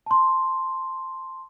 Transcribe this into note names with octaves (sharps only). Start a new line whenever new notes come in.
A5 C6